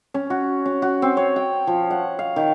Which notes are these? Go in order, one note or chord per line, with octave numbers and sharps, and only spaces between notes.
C#4
F#4
C#4
F#4
C4
C#5
G5
F3
F#5
F5
D#3